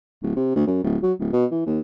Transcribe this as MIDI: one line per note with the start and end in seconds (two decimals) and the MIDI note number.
0.23 0.32 26
0.36 0.55 48
0.56 0.65 38
0.67 0.79 42
0.84 0.97 26
1.03 1.13 54
1.19 1.31 26
1.33 1.45 47
1.51 1.65 52
1.66 1.79 39